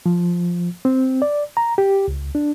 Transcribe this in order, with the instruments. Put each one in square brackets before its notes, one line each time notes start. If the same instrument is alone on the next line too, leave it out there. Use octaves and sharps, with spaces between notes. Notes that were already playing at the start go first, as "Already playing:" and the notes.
[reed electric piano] F3
C4
D5
A#5
G4
C#2
D4